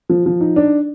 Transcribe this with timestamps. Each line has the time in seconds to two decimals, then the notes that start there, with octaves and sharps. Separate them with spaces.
0.09 F3
0.26 F3
0.41 D#4
0.56 D4